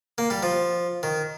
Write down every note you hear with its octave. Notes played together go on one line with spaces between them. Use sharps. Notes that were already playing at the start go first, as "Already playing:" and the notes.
A#3
G3
F3
D#3